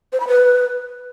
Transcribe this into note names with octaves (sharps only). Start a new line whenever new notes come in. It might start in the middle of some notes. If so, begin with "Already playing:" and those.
C5
B5
B4